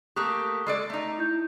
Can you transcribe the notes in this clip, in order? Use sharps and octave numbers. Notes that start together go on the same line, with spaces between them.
A3 A#3 G4 C#6 D#6 F#6
G#3 A4 D5 C7
A3 D#4
E4 G6